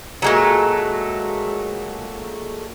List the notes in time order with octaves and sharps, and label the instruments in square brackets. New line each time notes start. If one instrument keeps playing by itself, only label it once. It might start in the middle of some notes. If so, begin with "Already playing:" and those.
[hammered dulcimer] A#2 F#4 A#5 [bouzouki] F#3 G#3 A3